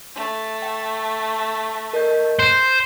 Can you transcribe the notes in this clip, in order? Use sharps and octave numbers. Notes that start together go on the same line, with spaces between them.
A3
G5
A#4 D#5 G6
C5 F#6